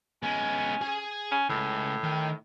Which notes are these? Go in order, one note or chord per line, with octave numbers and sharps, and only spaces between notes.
G#3 B3 C#4
G#4 G#5
C#4
C#2 A2
D#3